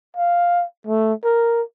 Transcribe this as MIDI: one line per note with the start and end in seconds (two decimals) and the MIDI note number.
0.17 0.64 77
0.87 1.13 57
1.24 1.62 70